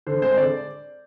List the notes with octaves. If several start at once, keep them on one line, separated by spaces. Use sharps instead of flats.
D3 C5
G#3 C4 C5
D3 D5